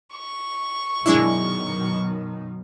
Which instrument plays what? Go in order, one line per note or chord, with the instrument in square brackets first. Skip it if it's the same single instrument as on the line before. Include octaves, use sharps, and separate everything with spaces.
[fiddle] C#6
[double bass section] F#2 B2 D#3 [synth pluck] G#3 D4 E4